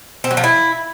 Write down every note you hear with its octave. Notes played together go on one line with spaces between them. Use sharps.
C4
F#3
F3
E4